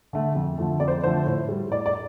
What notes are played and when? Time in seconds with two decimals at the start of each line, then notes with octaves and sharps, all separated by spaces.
0.13 D3 A3
0.35 F2
0.58 D3 F3 A3
0.80 F2 D5
0.88 C5
1.03 D3 F3 A3 C5
1.26 A2
1.49 G3
1.70 A2 D5
1.86 D5